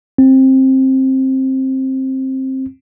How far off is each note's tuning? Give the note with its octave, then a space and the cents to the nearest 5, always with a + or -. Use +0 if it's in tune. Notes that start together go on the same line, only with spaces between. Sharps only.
C4 +15